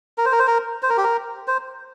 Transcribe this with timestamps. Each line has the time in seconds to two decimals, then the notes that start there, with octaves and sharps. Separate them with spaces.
0.18 A#4
0.25 C5
0.32 A#4
0.39 C5
0.47 A#4
0.83 C5
0.90 A#4
0.97 G4
1.04 A#4
1.48 C5